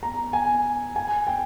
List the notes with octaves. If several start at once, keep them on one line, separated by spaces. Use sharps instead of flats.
A#5
G#5
G#5
G5